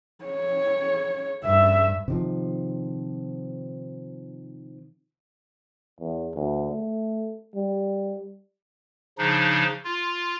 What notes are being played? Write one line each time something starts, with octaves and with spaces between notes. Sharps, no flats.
C#5
G2 E5
C3 D#3 F3
E2
D2
A3
G3
C#3 F3 D4 D#4
F4